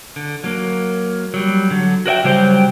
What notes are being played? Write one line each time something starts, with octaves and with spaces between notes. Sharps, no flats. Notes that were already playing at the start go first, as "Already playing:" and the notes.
D3
F#3 A#3
F#3 G3
D3 F#3
F#4 A#4 D5 E5 G5
C#3 F#3 G3 G4 C5 G5